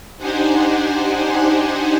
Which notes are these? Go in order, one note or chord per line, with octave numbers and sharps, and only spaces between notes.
D4 D#4 G4 C5 F#5 G#5